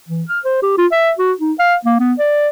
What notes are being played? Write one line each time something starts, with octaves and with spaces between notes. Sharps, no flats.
E3
F6
C5
G4
F4
E5
F#4
D#4
F5
A#3
B3
D5